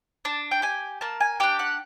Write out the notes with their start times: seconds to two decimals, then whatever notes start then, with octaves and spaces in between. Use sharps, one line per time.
0.25 D4 A5
0.51 G5
0.62 G4 G#5
1.01 A#3 A5
1.20 G#5
1.40 D4 G4 G5
1.59 F#5